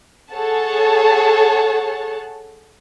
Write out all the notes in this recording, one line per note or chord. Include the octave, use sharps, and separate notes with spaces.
G#4 A4 C#5 F#5 A5